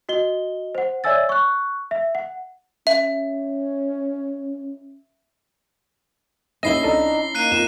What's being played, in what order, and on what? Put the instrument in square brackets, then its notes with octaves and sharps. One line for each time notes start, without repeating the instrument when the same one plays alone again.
[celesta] F#4 D#5 G7
C5 F#5
C#5 D5 E5 G#5 E6 A6
C#6 F#6
E5
F#5
[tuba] C#4 [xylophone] E5
[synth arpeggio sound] D#2 D#5 [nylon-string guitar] C#4 E4 [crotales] A#6 C7 G7
[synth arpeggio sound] C2 A4 D#5 [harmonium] D4 D#4
[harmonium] D#3 A#3 A#5 [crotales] F#6 C7 D#7
[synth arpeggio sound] F2 [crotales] E7